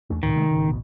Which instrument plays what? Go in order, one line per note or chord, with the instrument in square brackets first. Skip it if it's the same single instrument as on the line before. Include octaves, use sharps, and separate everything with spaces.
[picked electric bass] E2 A3 D4
[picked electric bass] C#2 A2 C3 [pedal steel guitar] D#3
[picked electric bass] C3 G#3 A3
G#1 C#3
A1 D2 B2